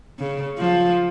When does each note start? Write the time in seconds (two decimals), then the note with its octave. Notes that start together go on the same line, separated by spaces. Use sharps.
0.19 C#3
0.58 F3